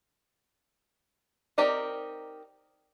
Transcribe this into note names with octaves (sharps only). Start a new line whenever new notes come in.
C4 D#4 G4 A#4 D5